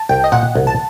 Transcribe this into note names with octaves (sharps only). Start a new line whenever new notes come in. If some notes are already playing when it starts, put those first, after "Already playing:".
Already playing: A5
C2 G5
D#5
A#2 F#5
C2
A5